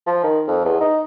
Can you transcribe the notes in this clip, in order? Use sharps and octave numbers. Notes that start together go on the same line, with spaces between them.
F3
D#3
F2
E2
D#4